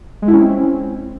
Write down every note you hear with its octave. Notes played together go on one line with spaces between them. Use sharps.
G#3
E4
C#4
C4